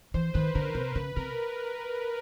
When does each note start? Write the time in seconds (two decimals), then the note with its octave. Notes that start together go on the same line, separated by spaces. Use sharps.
0.14 E3 C5
0.34 D#3 B4
0.55 D3 A#4
0.75 C3
0.96 C#3 B4
1.16 C3 A#4